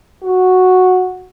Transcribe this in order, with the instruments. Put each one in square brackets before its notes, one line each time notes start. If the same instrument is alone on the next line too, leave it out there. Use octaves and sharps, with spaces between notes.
[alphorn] F#4